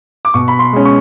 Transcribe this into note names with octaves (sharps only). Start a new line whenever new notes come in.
D6
B2 C#6
B5
C6
G#3 C#4
C#6